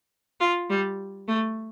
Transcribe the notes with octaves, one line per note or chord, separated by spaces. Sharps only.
F4
G3
A3